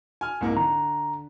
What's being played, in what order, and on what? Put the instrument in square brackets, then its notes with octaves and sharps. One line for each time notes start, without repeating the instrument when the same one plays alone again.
[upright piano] G#5 F6
C2 G#2 A#3
[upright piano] D3 [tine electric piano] A#5